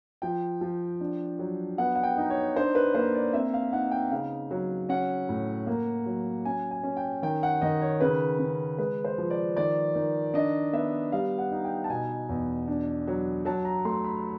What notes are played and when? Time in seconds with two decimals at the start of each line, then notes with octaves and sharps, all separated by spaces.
0.22 F3 G5
0.61 F3
1.01 D4
1.39 F#3
1.78 B3 F#5
1.95 F#5
2.03 G5
2.17 D#4
2.30 C#5
2.56 D4 C5
2.75 B4
2.95 A#3 C5
3.15 D5
3.33 C4 E5
3.54 F5
3.73 D#4 F#5
3.91 G5
4.12 C#3 F5
4.51 F#3
4.89 C#4 F#5
5.29 A2
5.67 A#3
6.06 F#3
6.45 C#4 G#5
6.71 G#5
6.83 C#4
6.97 G5
7.22 D#3 G5
7.43 F#5
7.62 D#3 D#5
7.82 C#5
8.00 C#3 B4
8.39 C#3
8.78 G#3 B4
9.05 C5
9.18 F3
9.30 D5
9.57 D#3 D5
9.95 D#3
10.34 D4 D#5
10.73 B3 E5
11.12 G3 F5
11.38 F#5
11.51 D#4
11.65 G5
11.84 A5
11.89 B2 G#5
12.29 E2
12.68 D4
13.07 F#3
13.45 F#3 A5
13.65 A#5
13.85 A3 C6
14.04 B5